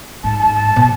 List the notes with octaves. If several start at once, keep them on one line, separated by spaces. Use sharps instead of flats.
G#2 A5
A5
A5
B2 A5